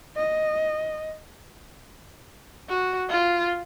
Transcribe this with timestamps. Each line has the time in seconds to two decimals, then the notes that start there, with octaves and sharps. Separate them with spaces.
0.16 D#5
2.69 F#4
3.10 F4